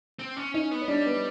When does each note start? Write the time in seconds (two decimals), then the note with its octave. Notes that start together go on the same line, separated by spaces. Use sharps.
0.19 C4
0.37 C#4
0.54 C#4 D#4 D#5
0.71 B3
0.81 C#5
0.88 G3 D4 D5
1.06 B3 B4